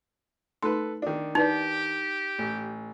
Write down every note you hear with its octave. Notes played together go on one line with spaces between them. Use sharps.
A3 D#4 A4 B4 C6
D#3 D4
D#4 E4 G4 B4 D5
A1